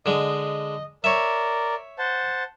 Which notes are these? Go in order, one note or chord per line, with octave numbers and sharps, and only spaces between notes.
D3 G#3 D#5
A#4 C#5 D5 E5
C5 F#5 A5